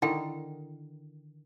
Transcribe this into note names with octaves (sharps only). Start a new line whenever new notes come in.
D3 D#3 E4 G5